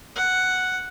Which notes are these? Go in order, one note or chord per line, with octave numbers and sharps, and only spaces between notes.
F#5